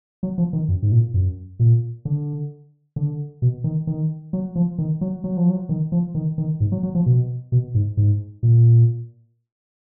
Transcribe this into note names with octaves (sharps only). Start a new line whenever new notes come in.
F#3
F3
D#3
F#2
G#2
A#2
F#2
A#2
D3
D3
B2
D#3
D#3
F#3
F3
D#3
F#3
F#3
F3
F#3
D#3
F3
D#3
D#3
G#2
F#3
F#3
F3
B2
B2
G#2
G#2
A#2